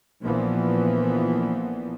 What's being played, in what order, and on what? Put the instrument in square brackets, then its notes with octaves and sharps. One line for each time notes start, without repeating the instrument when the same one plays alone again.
[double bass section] A#1 A#2 E3 F3 B3